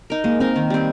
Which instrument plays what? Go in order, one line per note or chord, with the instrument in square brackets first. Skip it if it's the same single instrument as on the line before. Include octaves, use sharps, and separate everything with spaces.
[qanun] D#4 A#4
[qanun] G#3 [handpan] A#3
[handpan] C4 [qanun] D#4 A#4
[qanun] D#3
G3 C4